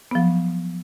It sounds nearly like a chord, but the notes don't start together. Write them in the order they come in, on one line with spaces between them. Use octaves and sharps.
B3 F3 F#3